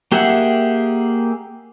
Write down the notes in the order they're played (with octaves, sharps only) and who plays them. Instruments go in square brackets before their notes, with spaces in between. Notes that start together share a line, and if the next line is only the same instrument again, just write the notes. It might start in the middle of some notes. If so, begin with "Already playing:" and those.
[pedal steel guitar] A#3 G4 G#4 E5 F#5